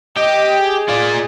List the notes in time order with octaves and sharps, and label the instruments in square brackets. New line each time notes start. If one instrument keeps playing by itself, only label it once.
[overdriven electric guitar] G4 [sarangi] D#5
[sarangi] G#4
[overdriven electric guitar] F4 D5